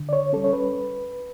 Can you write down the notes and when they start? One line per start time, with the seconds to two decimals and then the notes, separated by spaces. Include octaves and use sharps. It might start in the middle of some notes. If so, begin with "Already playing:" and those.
Already playing: D3
0.09 D5
0.13 C#5
0.33 G3 C#4 A4
0.44 C#5
0.53 B4